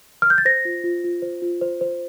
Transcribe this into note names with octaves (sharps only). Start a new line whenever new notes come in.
F6
G6
A6
C5 A#6
F4
F4
F4
C5
F4
C5
C5